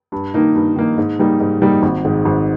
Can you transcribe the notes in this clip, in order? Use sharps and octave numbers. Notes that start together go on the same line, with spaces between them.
G2
D#3 A#3 D#4
G2
D#3 A#3 D#4
G#2
G3 A#3 D#4
G#2
G3 A#3 D#4
G#1
G#2 D#3 G#3
G#1